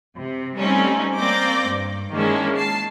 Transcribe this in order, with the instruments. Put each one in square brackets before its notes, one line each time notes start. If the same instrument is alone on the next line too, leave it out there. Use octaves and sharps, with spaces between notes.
[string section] C3
G3 A3 C4 C#4 D#4
A#3 C4 D5 D6 G6 A#6
G2
D#3 G#3 A#3 C#4 D4 E4
A5 C7